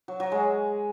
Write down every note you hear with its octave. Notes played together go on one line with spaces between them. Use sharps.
F#3
F#3
G#3